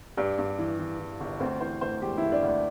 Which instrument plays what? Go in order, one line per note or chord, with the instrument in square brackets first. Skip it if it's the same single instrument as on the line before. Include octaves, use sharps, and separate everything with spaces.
[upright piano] G2 D4
G2
E3
E3
E3
G1
D2 C4
E3 C5
D2 C5
E1 G4
E3 E4
D4
D2
D4